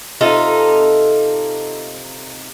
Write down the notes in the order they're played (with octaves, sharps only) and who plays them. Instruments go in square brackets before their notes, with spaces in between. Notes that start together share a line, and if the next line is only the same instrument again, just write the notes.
[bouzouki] C3 D#4 F4 A4